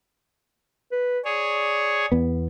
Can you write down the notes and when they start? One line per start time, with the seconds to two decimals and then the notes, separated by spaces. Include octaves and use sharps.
0.92 B4
1.25 G#4 C#5 D5
2.12 E2 B3